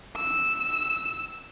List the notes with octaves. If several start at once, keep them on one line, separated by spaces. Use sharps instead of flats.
E6